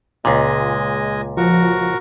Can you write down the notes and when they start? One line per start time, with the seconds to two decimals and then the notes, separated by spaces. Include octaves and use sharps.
0.25 C#2 A#2 G#3 D#5 G#5
1.37 F3 F#4 A#4 C#6